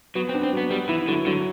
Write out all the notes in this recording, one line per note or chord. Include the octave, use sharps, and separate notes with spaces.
F#3 B3
C4
D4
C4
F#3 B3
G3 B3
E3 E4
D3 F#3
D3 F#3